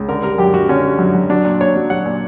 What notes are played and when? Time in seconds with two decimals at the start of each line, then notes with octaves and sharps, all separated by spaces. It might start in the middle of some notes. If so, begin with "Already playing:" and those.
Already playing: C#2
0.08 D3 A#4
0.23 G3 A#4
0.38 F#2 G4
0.54 F#2 F#4
0.69 D3 C#4
0.84 G3
0.99 F#2
1.15 F#2
1.30 F#3 D4
1.45 A#2
1.61 A#2 C#5
1.76 F#3
1.90 F#3 F#5
2.06 A#2